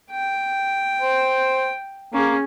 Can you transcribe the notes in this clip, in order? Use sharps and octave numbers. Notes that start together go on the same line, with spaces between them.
G5
C5
A#3 C#4 G#4